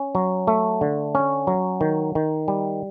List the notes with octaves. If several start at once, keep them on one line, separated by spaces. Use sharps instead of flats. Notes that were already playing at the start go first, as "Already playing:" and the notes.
Already playing: C#4
F#3
A3
D3
C#4
F#3
D#3
D#3
G3